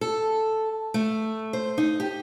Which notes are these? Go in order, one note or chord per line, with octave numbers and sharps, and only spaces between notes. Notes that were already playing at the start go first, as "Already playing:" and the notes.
A4
A3
C5
D#4
G4